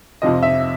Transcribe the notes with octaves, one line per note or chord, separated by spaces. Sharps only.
F2 C3 F3 D#5
E5